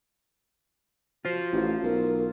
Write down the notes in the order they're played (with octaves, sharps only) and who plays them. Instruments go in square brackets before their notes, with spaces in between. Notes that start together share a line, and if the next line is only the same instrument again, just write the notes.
[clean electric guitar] F4 C5 [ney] F#4
[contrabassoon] A1
[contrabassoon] B1 [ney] A#4